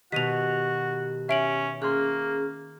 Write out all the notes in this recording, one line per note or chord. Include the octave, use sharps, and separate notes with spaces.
B2 D#3 F#4 G4 B6 D#7 F7
C#4 E5 D7 F#7
A#3 C#4 G#4 C6 F#6